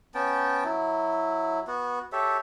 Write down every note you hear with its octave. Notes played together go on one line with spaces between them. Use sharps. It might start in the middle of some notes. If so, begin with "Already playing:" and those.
B3 C#4 G5 A5
F#3 E4
B3 F#4
G4 A4 C#5 E5